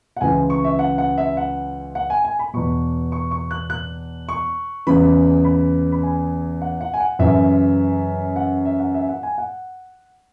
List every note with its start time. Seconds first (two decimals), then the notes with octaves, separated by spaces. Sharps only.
0.17 F#5
0.21 C#2 C#3 E3 G#5
0.50 C#6
0.64 E5
0.79 F#5
0.98 F#5
1.18 E5
1.37 F#5
1.95 F#5
2.10 G#5
2.24 G#5
2.39 B5
2.53 E2 B2 C#6
3.12 C#6
3.31 C#6
3.51 F#6
3.70 F#6
4.29 C#6
4.87 E2 C#3 E3 B5
5.45 B5
5.92 B5
6.03 G#5
6.61 F#5
6.81 F#5
6.94 G#5
7.00 F#5
7.19 F#2 C#3 E3 E5
8.36 F#5
8.65 E5
8.79 F#5
8.94 E5
9.09 F#5
9.23 G#5
9.38 F#5